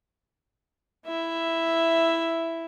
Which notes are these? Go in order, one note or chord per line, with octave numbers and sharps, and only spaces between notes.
E4 E5